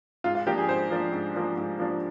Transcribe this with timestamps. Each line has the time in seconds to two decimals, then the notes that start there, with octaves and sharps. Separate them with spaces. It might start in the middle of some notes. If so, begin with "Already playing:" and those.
0.24 G#2 F4
0.35 F4
0.47 F3 A#3 D4 G4
0.58 G#4
0.69 G#2 C5
0.90 F3 A#3 D4
1.12 G#2
1.34 F3 A#3 D4
1.57 G#2
1.79 F3 A#3 D4